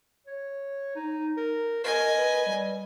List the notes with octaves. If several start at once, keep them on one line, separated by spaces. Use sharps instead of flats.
C#5
D#4
A#4
A#4 D#5 G#5
B4
G3